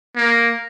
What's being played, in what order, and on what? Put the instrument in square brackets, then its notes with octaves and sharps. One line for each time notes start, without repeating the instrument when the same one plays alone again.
[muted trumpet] A#3